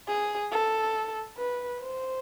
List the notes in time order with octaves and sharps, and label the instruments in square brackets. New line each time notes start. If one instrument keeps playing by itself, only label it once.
[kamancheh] G#4
A4
B4
C5